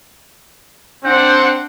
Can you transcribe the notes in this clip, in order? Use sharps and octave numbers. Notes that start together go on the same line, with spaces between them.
C4 D4 F#5 G6